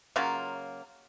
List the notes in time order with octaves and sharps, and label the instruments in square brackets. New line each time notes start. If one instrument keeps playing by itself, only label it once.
[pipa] C#3 F#3 A#3 C#4 F4